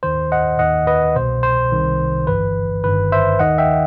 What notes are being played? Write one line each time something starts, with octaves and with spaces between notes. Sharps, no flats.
D#2 D#3 C5
D#5 F#5
D#2 D#3 D#5 F#5
B4 D#5
C2 B2 C5
C5
C2 C3 D#3
G1 G2 E3 B4
G1 G2 D#3 B4
C5 E5
D#2 D#3 D#5 F#5
E5 G5